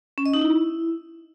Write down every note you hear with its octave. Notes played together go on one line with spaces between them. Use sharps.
C#4
D#5
D#4
E4